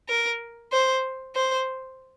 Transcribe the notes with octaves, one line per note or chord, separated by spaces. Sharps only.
A#4
C5
C5